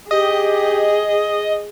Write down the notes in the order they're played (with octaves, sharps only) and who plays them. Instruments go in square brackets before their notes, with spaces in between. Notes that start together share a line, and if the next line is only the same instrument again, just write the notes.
[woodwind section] G4 [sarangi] G#4 [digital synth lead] D#5